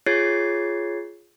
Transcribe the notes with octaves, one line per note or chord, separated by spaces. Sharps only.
F4 G#4 C#5 G#6 A6 C7